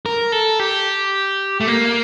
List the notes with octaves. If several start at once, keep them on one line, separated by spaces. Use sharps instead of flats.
A#4
A4
G4
A3
A#3